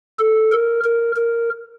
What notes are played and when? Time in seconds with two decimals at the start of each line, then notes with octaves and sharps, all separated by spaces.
0.19 A4
0.52 A#4
0.84 A#4
1.16 A#4